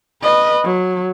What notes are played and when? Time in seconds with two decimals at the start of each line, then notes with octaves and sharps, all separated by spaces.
0.23 B4 D#5
0.64 F#3